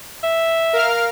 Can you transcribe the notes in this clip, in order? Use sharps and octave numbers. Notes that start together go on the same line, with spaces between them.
E5
A#4 F5 F6